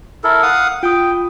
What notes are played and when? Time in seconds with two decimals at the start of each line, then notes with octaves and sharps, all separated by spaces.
0.24 E4 A4 A#4
0.43 F5 F#5 D#6
0.83 F4 G5 D#6